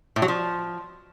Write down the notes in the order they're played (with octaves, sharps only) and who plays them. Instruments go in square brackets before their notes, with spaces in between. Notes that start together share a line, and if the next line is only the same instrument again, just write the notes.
[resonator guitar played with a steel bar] A2
F#3
F3